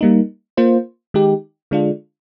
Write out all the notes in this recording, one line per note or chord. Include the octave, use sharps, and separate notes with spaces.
G3 A#3 D#4
A#3 F4 C5
D#3 G#3 D#4 G4
D3 G#3 D4 F4